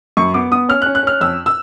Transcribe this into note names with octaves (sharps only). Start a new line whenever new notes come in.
F#2 C#6
B3 D6
B3 D#6
C#4 F6
F#6
C#4
F#6
C#4 F6
F2 E6
E6